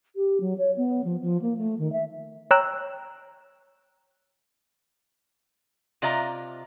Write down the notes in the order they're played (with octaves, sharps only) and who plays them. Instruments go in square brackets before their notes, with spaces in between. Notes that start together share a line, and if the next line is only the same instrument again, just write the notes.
[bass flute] G4
F#3
C#5
B3
F3
F3
A#3
A3
D#3
E5
[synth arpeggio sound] C#5 G5 A#5 E6 F#6 E7
[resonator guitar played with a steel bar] C3 F4 D5 D#5 A#5